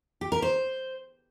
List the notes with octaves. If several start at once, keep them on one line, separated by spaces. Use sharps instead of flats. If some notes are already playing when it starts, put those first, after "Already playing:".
G4
A#4
C5